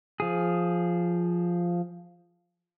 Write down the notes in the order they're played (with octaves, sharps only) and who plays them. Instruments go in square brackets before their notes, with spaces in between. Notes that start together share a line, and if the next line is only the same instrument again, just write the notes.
[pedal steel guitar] F3 G#4